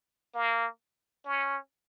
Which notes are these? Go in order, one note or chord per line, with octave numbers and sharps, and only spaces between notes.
A#3
C#4